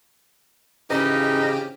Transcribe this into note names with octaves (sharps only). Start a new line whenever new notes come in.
F2 G#2 C#3 E3 C#4 D#4 G4 D#5